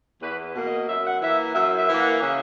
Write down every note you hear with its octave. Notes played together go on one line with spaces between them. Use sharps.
E2 B4
B2 A#3
D#5
F#2 E5
F#5
E3 A#3 E5
F#2 E5
E5
E3 A#3
F#5
C#3 E5